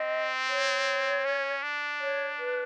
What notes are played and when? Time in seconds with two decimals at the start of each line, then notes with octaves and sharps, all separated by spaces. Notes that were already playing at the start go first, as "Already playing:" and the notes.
Already playing: C4 D#5
0.49 C#5
1.25 C#4
1.63 D4
2.00 C#5
2.39 B4